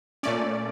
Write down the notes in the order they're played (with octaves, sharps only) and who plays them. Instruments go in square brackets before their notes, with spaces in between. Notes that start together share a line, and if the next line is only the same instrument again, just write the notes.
[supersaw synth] A#2 A3 C#4 D5